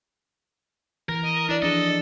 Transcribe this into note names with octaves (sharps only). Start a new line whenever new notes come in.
E3 A#4
D#5
D4 E4 D5
F3 D4 G#4 A4 D#5